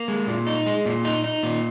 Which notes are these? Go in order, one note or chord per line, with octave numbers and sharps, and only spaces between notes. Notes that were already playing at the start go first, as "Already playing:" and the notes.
Already playing: A#3
G#3
A#2
D#4
G#3
A#2
D#4
D#4
A#2